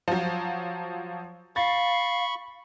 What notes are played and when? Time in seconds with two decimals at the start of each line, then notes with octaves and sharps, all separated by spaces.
0.08 F3 F#3
1.56 F5 B5 C#6 A6